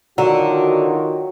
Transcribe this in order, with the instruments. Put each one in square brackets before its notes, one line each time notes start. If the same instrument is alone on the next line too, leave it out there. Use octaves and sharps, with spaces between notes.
[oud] D3 [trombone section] D#3 F4 F#4 [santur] F#3